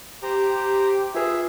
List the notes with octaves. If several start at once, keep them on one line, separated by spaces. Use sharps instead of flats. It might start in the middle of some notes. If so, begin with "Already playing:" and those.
G4 C5 A#5
F4 G#4 B4 E5 D#6